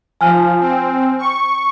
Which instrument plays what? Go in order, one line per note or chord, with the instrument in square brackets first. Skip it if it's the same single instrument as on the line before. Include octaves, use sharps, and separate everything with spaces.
[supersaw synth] F3 [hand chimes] G#5 F6
[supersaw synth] C4
C#6